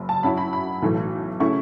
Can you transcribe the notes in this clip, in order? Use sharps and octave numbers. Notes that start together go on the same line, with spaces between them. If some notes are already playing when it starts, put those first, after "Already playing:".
Already playing: F#1
A5
F#2 F#3 C#4 E4 B5
B5
B5
B1 A2 E3 A3
C#3 A3 C#4 E4 C#6